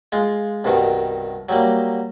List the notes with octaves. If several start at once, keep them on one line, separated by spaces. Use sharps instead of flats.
G#3 F4
C2 G2 B2 D#3
F#3 G3 A#3